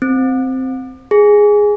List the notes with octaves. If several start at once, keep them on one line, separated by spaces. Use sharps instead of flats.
C4
G#4